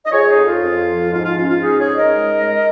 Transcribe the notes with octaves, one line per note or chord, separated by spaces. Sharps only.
D#5
F3 G#4 C#5
D#4 G#4
F2
F4
F2
F3
G#2 F4
F4
C#4 F4
F4
G#2 D#4 G#4
G#4 C#5
G#2
A#4 D#5
G#3
G#3